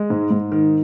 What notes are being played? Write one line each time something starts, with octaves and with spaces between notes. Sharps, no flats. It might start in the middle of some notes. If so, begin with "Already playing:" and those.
Already playing: G#3
G#2
G#2
D#3